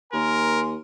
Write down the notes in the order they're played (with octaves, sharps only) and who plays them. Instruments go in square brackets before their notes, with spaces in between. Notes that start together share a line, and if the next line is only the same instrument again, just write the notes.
[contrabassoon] D#2 [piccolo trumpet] A#4 [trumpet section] G#5 A#5 C6